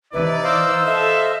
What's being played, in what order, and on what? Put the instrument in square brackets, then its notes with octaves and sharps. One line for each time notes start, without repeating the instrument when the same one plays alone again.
[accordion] C3 E4 [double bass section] E3 [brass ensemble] D#4 D5 [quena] B4
[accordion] C5 D#5 F5 [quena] E6
[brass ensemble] A4 [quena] E5